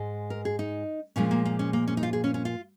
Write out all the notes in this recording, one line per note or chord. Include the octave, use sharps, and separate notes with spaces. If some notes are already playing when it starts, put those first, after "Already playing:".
Already playing: G#2 G#3
A#4
G#4
D#4
A#2 F3 G#3 C#4
A#3
A#3
C#4
A#3
C#4
D#4
F4
G#4
C#4
C#4
F4